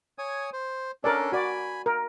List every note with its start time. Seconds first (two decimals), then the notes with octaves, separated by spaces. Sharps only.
0.18 C#5 G#5 D#6
0.53 C5
1.04 C#4 D4 A4 A#4 D5
1.32 F#4 D5 G#5 B5
1.86 A#4